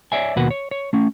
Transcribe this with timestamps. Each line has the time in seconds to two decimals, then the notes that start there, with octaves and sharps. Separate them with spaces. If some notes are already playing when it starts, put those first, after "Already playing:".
0.12 C#5 D5 E5 G#5
0.36 D#2 B2 A#3 F#4 B4 F#5
0.51 C#5
0.71 C#5
0.93 A3 C#4